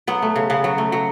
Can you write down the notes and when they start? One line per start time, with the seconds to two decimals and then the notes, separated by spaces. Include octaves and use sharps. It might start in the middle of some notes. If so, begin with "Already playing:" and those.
0.07 F#3 B3
0.22 A3
0.36 C#3
0.50 C#3 B3
0.64 F#3
0.78 A3
0.92 F#3